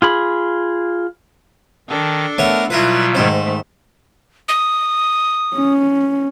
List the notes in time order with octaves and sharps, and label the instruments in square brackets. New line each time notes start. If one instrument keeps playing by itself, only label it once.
[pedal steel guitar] F4 G#4 B5
[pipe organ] D#3 [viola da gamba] D4 A4
[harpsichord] A3 B3 C#5 [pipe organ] A#4
[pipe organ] B2 F#3 G3 [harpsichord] E4 B4 [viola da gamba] F4
[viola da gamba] G#2 D#3 A3 [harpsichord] C5
[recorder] D#6
[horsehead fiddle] C#4